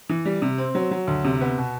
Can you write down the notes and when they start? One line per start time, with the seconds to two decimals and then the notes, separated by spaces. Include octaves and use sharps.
0.09 E3
0.25 G3
0.42 C3
0.58 C4
0.75 F#3
0.91 F#3
1.08 D2
1.24 C3
1.41 B3
1.58 B2